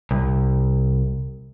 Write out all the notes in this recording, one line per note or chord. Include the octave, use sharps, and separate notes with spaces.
C2